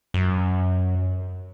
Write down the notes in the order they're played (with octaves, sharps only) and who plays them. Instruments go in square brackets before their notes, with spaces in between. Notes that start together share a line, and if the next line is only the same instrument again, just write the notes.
[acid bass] F#2